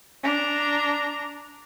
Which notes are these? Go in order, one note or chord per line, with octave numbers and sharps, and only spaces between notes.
D4 A#5